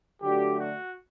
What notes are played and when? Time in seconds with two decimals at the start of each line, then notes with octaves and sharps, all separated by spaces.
0.22 D3 F#3 A3 D4 G4
0.59 F#4